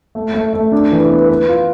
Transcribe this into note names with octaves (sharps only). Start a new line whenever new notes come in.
A3
A3
A3
D4
E3
B3
B4
F4